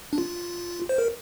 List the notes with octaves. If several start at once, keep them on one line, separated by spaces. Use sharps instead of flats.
D4
F4
C5
A#4